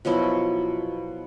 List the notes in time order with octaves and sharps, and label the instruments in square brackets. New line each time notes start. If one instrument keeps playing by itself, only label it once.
[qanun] B2 F3 F#3 E4